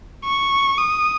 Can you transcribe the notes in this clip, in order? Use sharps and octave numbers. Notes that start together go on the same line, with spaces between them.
C#6
D#6